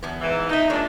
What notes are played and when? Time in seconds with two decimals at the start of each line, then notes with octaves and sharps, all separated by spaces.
0.03 E2 B2 B3
0.21 G#2 E3
0.49 B2 D#4 E5
0.70 A#2 G#3 D4 C#5